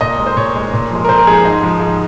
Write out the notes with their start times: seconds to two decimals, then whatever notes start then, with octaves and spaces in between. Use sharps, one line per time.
0.01 A#2 D#5
0.20 G#3
0.26 C5
0.36 A#2 C#5
0.56 G#3
0.73 A#2
0.91 F3 G#3
1.05 A#4
1.09 A#2 C5
1.18 A#4
1.27 F3 G#3 G#4
1.44 G#2 D#4
1.62 F3 G#3
1.80 G#2